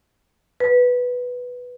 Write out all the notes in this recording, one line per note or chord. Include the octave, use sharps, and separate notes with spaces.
B4